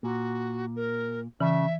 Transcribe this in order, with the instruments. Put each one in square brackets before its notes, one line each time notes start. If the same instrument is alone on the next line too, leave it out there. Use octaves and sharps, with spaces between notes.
[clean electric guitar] A#2 [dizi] F#4
[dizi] A#4
[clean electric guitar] C#3 [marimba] E3 [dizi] E5